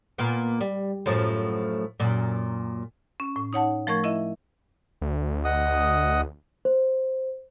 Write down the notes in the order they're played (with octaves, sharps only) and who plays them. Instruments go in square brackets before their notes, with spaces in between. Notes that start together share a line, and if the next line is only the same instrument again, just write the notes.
[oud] A#2 A#3 B3
G3
F#2 A2 F3
F#2 A#2
[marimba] C#4
A2
D#4 C#5 F#5 A5
F3 A3 A#4 C#6 G#6
E4 D#5 E5
[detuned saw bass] D2
[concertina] D#5 F#5 D#6
[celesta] C5